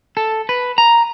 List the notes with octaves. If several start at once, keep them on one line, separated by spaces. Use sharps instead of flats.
A4
B4
A#5